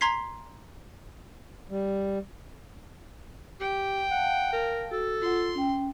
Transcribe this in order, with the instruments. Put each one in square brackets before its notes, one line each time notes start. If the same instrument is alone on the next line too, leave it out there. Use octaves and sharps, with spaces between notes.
[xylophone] A#5 C6 G#6 B6 C7
[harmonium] G3
[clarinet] G4 [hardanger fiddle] G5
[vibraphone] F5 A5 [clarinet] F#5
[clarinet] A#4
[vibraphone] F#4 [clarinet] A4
[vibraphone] F4 F#5 [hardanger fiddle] C6
[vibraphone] C#4 G5